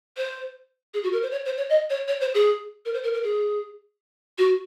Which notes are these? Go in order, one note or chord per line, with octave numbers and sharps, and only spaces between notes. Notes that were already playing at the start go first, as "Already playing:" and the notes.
C5
G#4
F#4
A#4
C5
C#5
C5
C#5
D#5
C#5
C#5
C5
G#4
A#4
C5
A#4
A#4
G#4
F#4